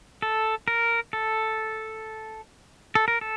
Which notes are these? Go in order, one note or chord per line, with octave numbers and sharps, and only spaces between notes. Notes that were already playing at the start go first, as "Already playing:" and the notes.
A4
A#4
A4
A4
A#4
A4